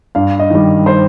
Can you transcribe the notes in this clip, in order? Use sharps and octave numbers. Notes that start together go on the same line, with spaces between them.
G2 F5
D#5
D#3 G3
C5